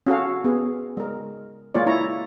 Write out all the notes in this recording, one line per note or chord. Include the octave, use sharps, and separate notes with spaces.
C#4 F#4 A4 F5
B3 G#4
G#3 A#4
G#3 A#3 F4 C#5 D5
E4 C#5 A#5